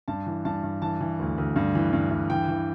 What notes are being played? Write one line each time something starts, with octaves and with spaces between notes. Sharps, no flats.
G2 A5
E3
G2 A5
G2
E3 A5
E3
D2
D2
G2
E3
G2
G2
E3 G5
E3